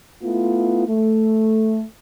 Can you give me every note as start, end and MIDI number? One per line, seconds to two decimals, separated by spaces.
0.23 0.87 57
0.23 0.87 59
0.23 0.87 64
0.23 0.87 65
0.88 1.83 57